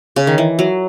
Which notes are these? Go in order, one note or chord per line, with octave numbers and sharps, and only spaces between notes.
C#3
D#3
E3
F#3